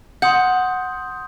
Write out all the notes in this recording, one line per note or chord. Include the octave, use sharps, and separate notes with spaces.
F#5 C6 D#6 G6